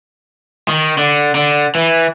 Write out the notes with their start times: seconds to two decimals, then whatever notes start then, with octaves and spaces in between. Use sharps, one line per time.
0.68 D#3
0.98 D3
1.35 D3
1.75 E3